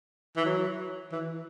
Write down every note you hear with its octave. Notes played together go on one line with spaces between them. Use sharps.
E3
F#3
E3